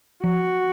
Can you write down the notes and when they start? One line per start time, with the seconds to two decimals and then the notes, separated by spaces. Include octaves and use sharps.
0.24 F3 F#4